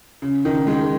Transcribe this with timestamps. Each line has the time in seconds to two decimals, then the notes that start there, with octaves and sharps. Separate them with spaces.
0.22 C#3
0.45 D#3
0.67 D#3 G#3